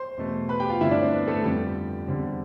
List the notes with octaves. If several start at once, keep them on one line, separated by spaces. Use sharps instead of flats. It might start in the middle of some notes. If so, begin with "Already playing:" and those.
Already playing: C5 C6
E2 B2 A3
B4 B5
G4 G5
F4 F5
G2 D3 A3 C4 E4 E5
D4 D5
C4 C5
B3 B4
A3 A4
F2 D3 G3 B3 G4
E2 D3 G3 C4